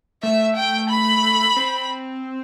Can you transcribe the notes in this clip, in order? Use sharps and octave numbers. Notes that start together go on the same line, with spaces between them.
A3 E5
G5
B5
C4